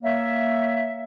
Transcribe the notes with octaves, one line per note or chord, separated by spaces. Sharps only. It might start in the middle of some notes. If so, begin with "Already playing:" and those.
A#3 C#5 E5